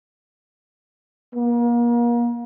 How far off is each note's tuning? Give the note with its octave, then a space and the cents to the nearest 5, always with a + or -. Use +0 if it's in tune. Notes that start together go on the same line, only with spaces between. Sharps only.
A#3 +35